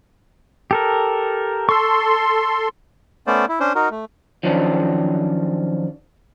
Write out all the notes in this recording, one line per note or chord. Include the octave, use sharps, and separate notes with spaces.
G4 A4 A#4
A4 C6 C#6 E6
A3 B3 C#4 C5 D5
E4
C#4 D4 C5
D#4 F#4 A#4
A3
D#3 F3 F#3 C#4 D4